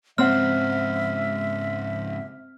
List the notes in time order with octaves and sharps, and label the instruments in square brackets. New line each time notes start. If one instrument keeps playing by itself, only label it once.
[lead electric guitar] G#2 C#3 [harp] C4 C5 F#5 [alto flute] E5 [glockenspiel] F6